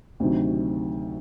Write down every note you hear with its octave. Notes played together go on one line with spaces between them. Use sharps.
D2 C3 D#3 F#3